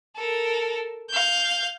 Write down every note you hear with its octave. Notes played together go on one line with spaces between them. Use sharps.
A4 A#4
F5 G6